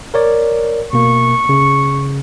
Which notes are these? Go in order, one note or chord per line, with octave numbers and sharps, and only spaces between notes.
A#4 C#5 D5
B2 A#3 C#6
C#3